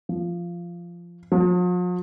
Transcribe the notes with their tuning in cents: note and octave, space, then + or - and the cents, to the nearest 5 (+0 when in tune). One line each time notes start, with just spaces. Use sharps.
F3 -10
F3 +45